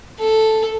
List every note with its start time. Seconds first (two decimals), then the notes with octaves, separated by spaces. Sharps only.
0.20 A4